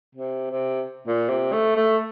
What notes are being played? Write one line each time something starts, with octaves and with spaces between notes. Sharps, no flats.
C3
C3
A#2
C3
A3
A3